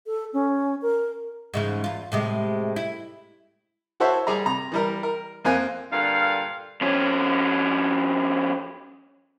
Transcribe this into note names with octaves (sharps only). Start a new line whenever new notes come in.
A4
C#4
A#4
G#2 C#3 E3
E2 F4
A2 C3 G#3
E4
E4 F#4 A4 C5 C#5 E5
G3 G#4 D5 A#5
C3 A#5
E3 G3 A#4
A#4
F2 A#3 C4 G#5 F#6
G2 A#2 D3 F5
F2 C#4